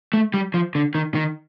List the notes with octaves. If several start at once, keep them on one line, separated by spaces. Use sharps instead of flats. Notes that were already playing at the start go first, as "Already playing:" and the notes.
A3
G3
F3
D3
D#3
D#3